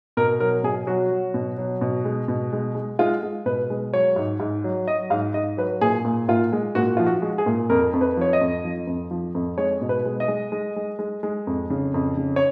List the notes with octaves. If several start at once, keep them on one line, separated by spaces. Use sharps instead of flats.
B2 A#4
F#3 A#4
B2 G#4
F#3 F#4
F#3
B2
F#3
B2
G#3
B2
G#3
G#3
G#3 F4
G#3
B2 B4
G#3
F#3 C#5
G#2
G#2
F#3
F#3 D#5
G#2 F5
G#2 D#5
F#3 B4
A#2 G#4
A#2
A#2 F4
G#3
A#2 F#4
F3 F4
F#4
G#3
G#4
A#2
F2 A#4
F2
B4
F3 C#5
D#5
F2
F3
F2
F3
F2
G#3 C#5
B2
B4
G#3
D#5
G#3
G#3
G#3
G#3
G#3
F2
C#3
F2
C#3
C#5